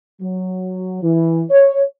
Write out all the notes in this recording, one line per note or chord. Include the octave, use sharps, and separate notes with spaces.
F#3
E3
C#5